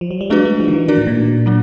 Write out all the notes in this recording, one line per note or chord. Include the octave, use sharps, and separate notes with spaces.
F3
F#3
G3
G#3 A3 D4 F#4 B4
G#3
F3
D#3
E3
D#3 D4 F#4 A#4 D5
A2
A#2
F#3 A#3 D4